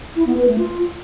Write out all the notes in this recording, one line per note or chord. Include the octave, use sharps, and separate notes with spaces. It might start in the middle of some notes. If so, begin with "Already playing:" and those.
E4
B3
B4
A3
F4